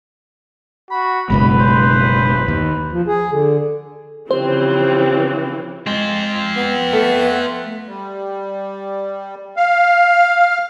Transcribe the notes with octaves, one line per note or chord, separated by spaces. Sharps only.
F#4 B5
F#1 B2 G#3 B4 B5
C5
D#2
F3
G#4
D3
C#3 E3 F3 C4 G4 C5
G#3 C4 F4
B3
A3 A4
G3
F5